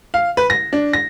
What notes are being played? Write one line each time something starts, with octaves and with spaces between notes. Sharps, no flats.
F5
B4
A#6
D4
A#6